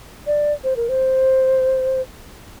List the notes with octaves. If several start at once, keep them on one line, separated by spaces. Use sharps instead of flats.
D5
C5
A#4
C5